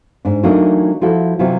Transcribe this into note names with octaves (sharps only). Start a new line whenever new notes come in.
G#2 D4
E3 F#3 A3 A#3 D4 D#4
F3 E4 F#4 A4
C3 E3 F#3 F4